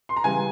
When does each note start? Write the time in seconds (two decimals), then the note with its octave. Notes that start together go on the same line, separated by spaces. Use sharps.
0.09 C6
0.16 A#5
0.24 C#3 E3 G3 G#5